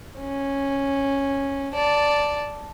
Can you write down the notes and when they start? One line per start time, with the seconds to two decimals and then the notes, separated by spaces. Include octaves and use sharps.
0.19 C#4
1.74 D5 A5